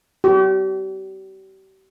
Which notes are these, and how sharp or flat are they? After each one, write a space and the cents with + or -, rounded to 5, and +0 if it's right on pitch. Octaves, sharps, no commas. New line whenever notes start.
G4 -40